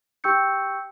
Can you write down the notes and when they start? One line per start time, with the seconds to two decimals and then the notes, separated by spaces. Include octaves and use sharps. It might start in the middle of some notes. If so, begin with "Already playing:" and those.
0.24 G4 G5 C#6 E6 G6 C#7